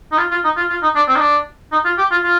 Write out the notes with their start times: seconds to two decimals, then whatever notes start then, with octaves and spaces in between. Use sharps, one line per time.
0.12 D#4
0.18 F4
0.31 F4
0.45 D#4
0.57 F4
0.70 F4
0.83 D#4
0.96 D4
1.08 C4
1.16 D#4
1.21 D4
1.72 D#4
1.85 F4
1.98 G4
2.11 F4
2.23 F4